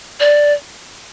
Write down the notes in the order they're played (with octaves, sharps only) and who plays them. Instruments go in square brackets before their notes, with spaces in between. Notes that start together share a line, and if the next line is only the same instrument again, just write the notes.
[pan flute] D5